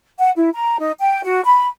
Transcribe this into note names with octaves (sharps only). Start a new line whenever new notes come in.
F#5
E4
A#5
D#4
G5
F#4
B5